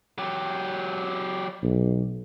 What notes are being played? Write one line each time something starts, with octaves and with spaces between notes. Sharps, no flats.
F#3 G4
B1